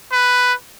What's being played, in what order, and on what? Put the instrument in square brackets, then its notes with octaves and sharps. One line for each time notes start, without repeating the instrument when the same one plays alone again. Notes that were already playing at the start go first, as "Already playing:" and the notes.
[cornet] B4